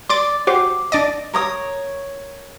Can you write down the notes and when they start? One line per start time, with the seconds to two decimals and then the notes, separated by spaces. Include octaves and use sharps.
0.09 D5 C6 D6 A6
0.47 F#4 G4 C5 D6
0.92 D4 D5 D#5
1.34 A#4 C#5 D#6